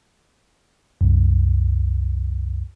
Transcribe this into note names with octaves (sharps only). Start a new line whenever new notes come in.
C2 F#2